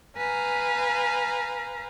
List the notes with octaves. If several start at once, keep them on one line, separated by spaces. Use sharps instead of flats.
B4 F5 G#5 A#5